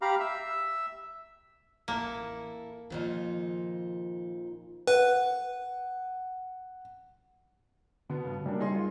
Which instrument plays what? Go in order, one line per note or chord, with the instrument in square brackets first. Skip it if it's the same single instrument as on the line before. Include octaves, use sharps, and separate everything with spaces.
[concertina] G4 F5 A#5 B5
E5 E6
[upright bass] A1 E2 [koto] A#3 [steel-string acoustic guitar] E4 A4
[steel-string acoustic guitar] F2 A#2 D#4 [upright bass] D#3 F3
[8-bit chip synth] B4 [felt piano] F#5
[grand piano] B2 B3 [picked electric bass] D3
[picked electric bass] G2 C#3
[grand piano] F#2 A#3 D4 [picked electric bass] G3
[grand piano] D#4 G#4 C6
F4